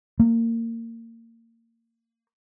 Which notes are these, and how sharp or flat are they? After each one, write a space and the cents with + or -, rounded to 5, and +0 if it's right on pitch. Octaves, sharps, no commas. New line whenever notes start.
A#3 -25